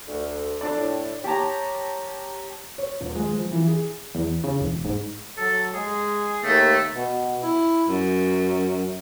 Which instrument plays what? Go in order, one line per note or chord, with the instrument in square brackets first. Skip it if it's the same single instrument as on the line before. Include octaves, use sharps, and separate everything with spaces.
[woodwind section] D2
[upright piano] D4 A4 D5
[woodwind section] A2
[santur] G4 C#5 A5 A#5
[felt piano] C#5
D#1
G#3
F3
E3
G#4
[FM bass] E2
C#3
E1
G#2
[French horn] F#3 [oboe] A4
[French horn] G#3 [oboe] G#4
[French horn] D#2 [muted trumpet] A3
[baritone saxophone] B2
E4
F#2